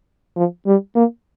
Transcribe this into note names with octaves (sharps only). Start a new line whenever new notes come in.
F3
G3
A#3